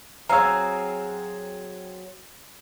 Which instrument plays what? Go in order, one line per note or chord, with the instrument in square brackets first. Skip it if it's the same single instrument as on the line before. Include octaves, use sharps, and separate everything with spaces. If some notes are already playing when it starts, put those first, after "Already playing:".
[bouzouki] F#3 C4 G#4 [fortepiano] C#5 F5 [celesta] A#5 E6